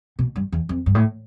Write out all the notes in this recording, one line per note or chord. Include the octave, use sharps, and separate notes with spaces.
B2
G2
E2
F2
G2
A2